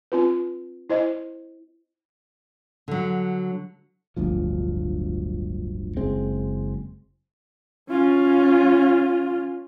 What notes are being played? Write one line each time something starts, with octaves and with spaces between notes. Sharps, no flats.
C4 F4 B4
E4 C5 D#5
D3 F#3
D1 G1 D2 F3
F#1 G#3 C4
C#4 F4